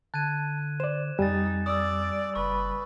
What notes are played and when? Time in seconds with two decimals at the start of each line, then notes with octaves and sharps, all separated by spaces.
0.14 D3 A5 F#6 G#6 D#7
0.80 C5 D5 E7
1.19 F2 G3 D#4 G#5 A6
1.66 D5 D#6 E6
2.35 F#1 B4 C#6